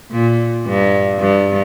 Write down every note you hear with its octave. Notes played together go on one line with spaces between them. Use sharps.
A#2
G2
G2